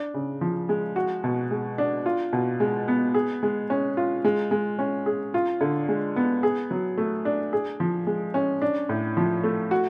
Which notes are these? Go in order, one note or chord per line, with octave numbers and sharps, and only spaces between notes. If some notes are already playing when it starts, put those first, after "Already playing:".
Already playing: D4
C#3
F3
G#3
F#4
B2
G#3
D4
F4
B2
G#3
B3
G#4
G#3
C#4
F4
G#3
G#3
C#4
G#4
F4
D3
G#3
B3
G#4
F#3
A3
D4
G#4
F3
G#3
C#4
D4
A2
F3
A3
F#4